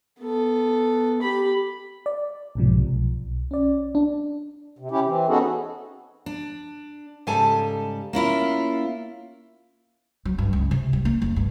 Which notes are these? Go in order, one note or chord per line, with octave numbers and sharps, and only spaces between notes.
B3 A4
G4 B5
D5
B1 G#2 C3 F3
B1
C#4 D5
D4
C3
C#4 E4 G4
E3 C4
B3 C#4 D#4 F#4 G#4 A4
D4
G#2 C#3 G3 A4 G#5 A5
A#3 C#4 E4 F4
F#3
G2
C#2
C3
G3
A#3
F1
G2